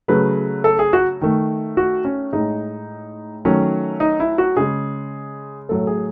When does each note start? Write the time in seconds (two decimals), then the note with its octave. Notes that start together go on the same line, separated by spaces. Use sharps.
0.08 C#3 F#3 A3 B4
0.64 A4
0.79 G#4
0.93 F#4
1.21 D#3 A3
1.77 F#4
2.05 C#4
2.33 A2 G#3 D#4
3.45 D#3 F#3 A3 C#4
4.00 D#4
4.20 E4
4.38 F#4
4.57 C#3 G#3 G#4
5.69 A2 F#3 A3 A4
5.87 G#4